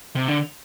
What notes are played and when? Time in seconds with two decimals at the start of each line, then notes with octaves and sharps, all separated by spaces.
0.16 C3
0.28 D3